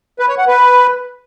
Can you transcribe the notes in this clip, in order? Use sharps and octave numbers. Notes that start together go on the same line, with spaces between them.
B4
C#5
F#5
B4